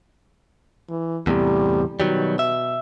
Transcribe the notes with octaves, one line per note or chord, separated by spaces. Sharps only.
E3
E2 A2 C3 G3
B2 D#3 F#3 G3
E5